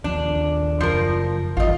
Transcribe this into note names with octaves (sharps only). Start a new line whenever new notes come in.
D#2 F3 D4
F#1 F3 A#4
G#1 E2 G2 D#3 F4 D#5